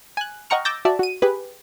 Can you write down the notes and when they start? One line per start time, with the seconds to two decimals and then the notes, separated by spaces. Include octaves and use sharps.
0.17 G#5 F#6
0.50 D#5 F#5 G5 A#5 C#6 F6
0.65 D6 E6 G6 A6 A#6
0.85 F#4 D5 E5 A5
0.99 F#4 D#7
1.22 G4 G#4 B4